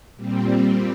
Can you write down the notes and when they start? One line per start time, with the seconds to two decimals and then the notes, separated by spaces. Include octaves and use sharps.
0.16 A#2 G3 C4